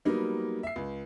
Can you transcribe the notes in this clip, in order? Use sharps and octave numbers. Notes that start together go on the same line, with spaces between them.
F#3 G3 A#3 B3 D#4
E5 C7
C#2